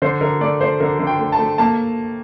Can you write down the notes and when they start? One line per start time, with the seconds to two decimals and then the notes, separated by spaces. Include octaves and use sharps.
0.02 D3 C5
0.21 D3 A#4
0.41 A3 D5
0.61 A3 C5
0.80 D3 A#4
0.99 D3
1.07 G5
1.19 A3
1.32 A5
1.39 A3
1.58 A#3 A5